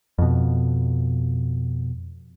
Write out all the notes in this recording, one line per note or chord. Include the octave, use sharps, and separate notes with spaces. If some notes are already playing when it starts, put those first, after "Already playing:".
F2 B2